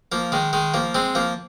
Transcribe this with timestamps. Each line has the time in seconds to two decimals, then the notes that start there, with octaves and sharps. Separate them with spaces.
0.12 F3 A#3
0.32 D#3 G#3
0.53 D#3 G#3
0.74 F3 A#3
0.95 G#3 C4
1.15 F3 A#3